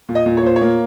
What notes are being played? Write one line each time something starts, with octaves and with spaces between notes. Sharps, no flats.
A#2
D#5
A#2
C#5
A#2 C5
C#5
A#3